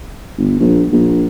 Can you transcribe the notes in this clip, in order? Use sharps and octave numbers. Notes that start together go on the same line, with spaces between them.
G1
A#1
A#1